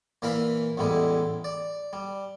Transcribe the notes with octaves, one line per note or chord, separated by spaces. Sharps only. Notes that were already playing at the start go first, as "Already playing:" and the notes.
A#2 E3 A#4 E5 F5 B5
A1 E2 A2 G3 G#3 E4
D5
G3